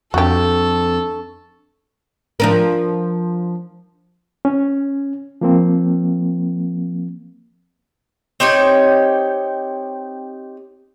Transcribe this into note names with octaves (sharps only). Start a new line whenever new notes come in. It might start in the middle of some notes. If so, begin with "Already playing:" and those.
F2 D4 F#4 G4 A4 C#6
F3 D4 A#4
C#4
F3 A#3 C4
C4 D#4 G4 C#5